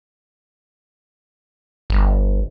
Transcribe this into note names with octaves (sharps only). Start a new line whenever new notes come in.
G1